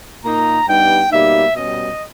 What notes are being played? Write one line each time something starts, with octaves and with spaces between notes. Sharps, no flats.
A#2 A#3 D#4 A#5
G2 G3 B3 D#4 G5
B2 G3 A#3 D#4 E5
B2 G3 C#4 D#5